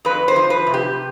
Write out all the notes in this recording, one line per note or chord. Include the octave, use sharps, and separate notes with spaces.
F2 B4
C5
F3
B4
C3
G4